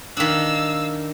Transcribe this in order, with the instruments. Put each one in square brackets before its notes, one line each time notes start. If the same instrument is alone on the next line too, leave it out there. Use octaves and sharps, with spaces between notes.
[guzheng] D#3 D4 [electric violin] F5 E6